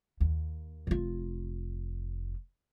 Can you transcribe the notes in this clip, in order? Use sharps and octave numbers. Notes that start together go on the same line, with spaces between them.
D#2
F1 F4